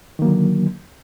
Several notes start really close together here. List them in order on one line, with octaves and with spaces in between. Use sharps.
D#3 A#3 F#3 D3